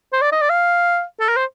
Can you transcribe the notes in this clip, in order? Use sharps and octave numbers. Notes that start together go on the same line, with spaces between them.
C5
D5
D#5
D5
F5
A4
A#4
C5